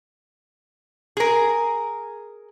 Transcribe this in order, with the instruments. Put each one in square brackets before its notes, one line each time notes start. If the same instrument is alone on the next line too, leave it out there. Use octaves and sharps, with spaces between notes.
[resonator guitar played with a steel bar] G#4 A#4